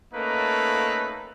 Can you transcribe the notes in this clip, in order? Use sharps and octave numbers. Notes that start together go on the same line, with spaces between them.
A3 A#3 C#4 D#4 A4 B4